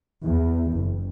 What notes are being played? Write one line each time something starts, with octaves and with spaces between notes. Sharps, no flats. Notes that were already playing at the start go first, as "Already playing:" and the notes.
E2
F#1